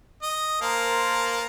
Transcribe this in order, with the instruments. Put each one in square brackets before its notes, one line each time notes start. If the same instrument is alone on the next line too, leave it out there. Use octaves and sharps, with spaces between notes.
[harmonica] D#5
[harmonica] A#3 [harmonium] A#4 C5 A5